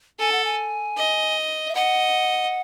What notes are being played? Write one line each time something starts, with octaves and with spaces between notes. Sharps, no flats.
A4 G#5
F#5
G#5
D#5
E5
D#5 F#5